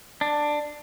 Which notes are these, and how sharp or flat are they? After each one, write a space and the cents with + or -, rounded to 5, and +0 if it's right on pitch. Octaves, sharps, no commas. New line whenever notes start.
D4 +10